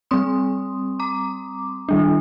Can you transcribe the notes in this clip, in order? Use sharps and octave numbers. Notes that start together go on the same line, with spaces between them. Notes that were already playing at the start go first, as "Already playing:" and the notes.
G3 C4 C6 D#6
A#5 D6
D#3 G3 D4